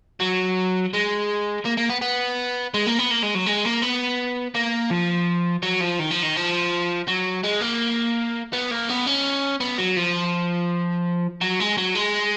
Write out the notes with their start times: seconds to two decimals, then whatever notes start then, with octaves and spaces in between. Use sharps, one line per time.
0.21 F#3
0.93 G#3
1.66 A#3
1.78 A#3
1.89 B3
2.01 B3
2.74 G#3
2.87 A#3
2.99 B3
3.11 A#3
3.23 G#3
3.35 F#3
3.46 G#3
3.65 A#3
3.82 B3
4.55 A#3
4.91 F3
5.63 F#3
5.81 F3
5.99 D#3
6.11 F3
6.22 D#3
6.36 F3
7.08 F#3
7.44 G#3
7.61 A#3
8.53 B3
8.71 A#3
8.89 B3
9.06 C#4
9.60 B3
9.78 F#3
9.97 F3
11.41 F#3
11.60 G#3
11.77 F#3
11.95 G#3